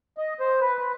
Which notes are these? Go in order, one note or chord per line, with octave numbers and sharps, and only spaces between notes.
D#5
C5
B4
B4